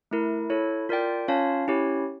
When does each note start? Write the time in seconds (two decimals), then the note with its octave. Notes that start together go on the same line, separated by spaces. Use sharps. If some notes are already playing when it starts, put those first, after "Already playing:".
0.11 A3 E4 A#4
0.50 E4 A4 C#5
0.89 F4 A#4 D5 G5
1.28 C#4 F4 C#5 F5 A5
1.68 C#4 E4 G4 C#5